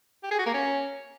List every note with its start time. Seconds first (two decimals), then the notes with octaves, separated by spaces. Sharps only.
0.23 G4
0.31 G#4
0.39 F#4
0.46 A#3
0.54 C#4